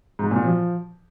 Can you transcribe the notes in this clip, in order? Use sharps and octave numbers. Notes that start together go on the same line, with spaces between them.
G#2
A#2
F3